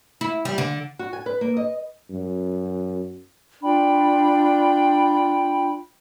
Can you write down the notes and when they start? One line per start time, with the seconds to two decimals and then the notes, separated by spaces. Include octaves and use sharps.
0.21 E4
0.45 G3
0.58 D3
0.99 F#4
1.13 G#5
1.26 B4
1.41 A#3
1.57 D#5
2.10 F#2
3.62 D4 F4 G5 B5